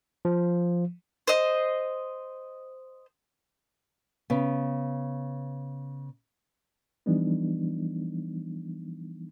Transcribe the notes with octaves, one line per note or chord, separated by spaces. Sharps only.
F3
C5 D#5
C#3 B3
E3 F3 G3 B3 D4 D#4